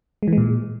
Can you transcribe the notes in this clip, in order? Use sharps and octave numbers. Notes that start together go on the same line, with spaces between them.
G#3
E3
G#3
A#2